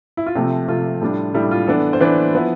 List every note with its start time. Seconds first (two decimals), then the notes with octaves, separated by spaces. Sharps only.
0.17 E4
0.26 F4
0.35 C3 F3 A3 G4
0.68 C3 F3 A3 F4
1.02 A2 G3 D4
1.34 A2 G3 D4 E4
1.51 F4
1.67 E3 B3 D4 A4
1.93 C5
2.00 E3 B3 D4 B4
2.33 F3 B3 E4